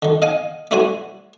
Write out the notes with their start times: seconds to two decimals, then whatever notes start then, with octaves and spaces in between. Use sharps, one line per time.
0.02 D3 D#3
0.22 D#5 F5 F#5 G#5
0.71 A3 D4 E4 F#4 C5 G#5